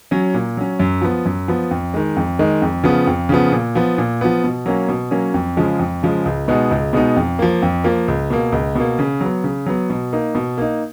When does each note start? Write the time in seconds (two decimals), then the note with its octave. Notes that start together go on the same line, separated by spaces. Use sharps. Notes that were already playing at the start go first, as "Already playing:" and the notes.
0.11 F#3 C#4
0.34 A#2
0.57 F#3 C#4
0.79 F#2
1.02 F3 B3
1.25 F#2
1.48 F3 B3
1.71 F2
1.94 D#3 G#3
2.16 F2
2.39 D#3 G#3
2.62 F2
2.84 C#3 F3 B3
3.07 F2
3.29 C#3 F3 B3
3.52 A#2
3.75 F3 B3
3.98 A#2
4.21 F3 B3
4.44 B2
4.66 F#3 A#3 C#4
4.89 B2
5.11 F#3 A#3 C#4
5.34 F2
5.57 C#3 F3 G#3
5.79 F2
6.03 C#3 F3 G#3
6.26 C#2
6.48 B2 G#3 B3 D#4
6.71 C#2
6.93 B2 G#3 B3 D#4
7.16 F2
7.39 F3 A#3
7.62 F2
7.84 F3 A#3
8.08 C#2
8.30 B2 A#3
8.52 C#2
8.75 B2 A#3
8.99 C#3
9.21 F#3 B3
9.44 C#3
9.66 F#3 B3
9.90 B2
10.13 A#3 D#4
10.35 B2
10.58 A#3 D#4